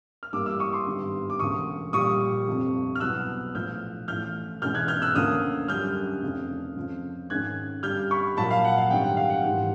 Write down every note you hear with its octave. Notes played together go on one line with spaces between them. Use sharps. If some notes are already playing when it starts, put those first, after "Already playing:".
F6
A1 G2 E3 G3 A#3 D6 E6
D6 E6
C#6 D#6
C6 D6
G#1 G2 D3 G3 B3
D6
E1 D2 C#3 C#6 D#6
A#1 A#2 G3 C#6 D#6
G1 F2 C3
F6
C2 B2 F#3 B3 E6 F#6
A#1 A2 F3 F6 G6
A1 A2 F3 F6 G6
F1 E2 B2 G#3 C#4 F6 G6
F#6 G#6
F6 G6
E6 F#6
D2 D3 F3 A#3 C#4 D#6 F6
F#2 D3 G3 F6 G6
F1 F2 C#3
F2 C#3 F3
G#2 D#3 G#3 C#4 F#6 G#6
G2 D3 G3 F6 G6
B5 C#6
A#1 A#2 F#3 A#3 A5 B5
F5
F#5
F5
G#1 F#2 D3 G3 G5
F#5
F5
F#5
G#1 G#2 E3 G3